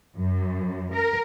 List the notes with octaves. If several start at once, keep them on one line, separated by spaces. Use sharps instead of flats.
F#2
A#4